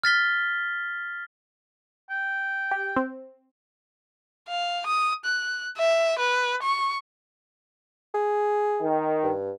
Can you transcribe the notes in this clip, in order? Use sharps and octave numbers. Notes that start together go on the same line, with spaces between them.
F6 A6 B6 G7
G5
G4
C4
F5
D#6
F#6
E5
B4
C#6
G#4
D#3
G2